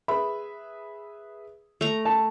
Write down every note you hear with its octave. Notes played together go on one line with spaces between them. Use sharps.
G#4 B4 E5 B5
A3 A#5
A5